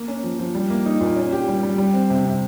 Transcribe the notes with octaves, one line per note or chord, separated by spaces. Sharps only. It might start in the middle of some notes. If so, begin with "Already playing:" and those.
Already playing: A#3
C#4
F3
F3
G3
A#3
D#4
A#2
C#4
G4
G3
G3
G3
C4
C3
C3